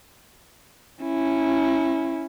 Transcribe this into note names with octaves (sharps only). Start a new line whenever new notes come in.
C#4 E4